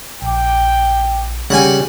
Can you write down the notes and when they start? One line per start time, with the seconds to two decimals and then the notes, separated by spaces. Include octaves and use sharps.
0.22 A#1 G5 D6
1.50 C#3 G3 F#5 G#5